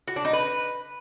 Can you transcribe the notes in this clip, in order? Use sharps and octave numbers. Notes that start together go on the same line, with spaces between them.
F#4
D4
D#4
B4